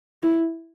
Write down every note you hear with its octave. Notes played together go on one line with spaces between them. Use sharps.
E4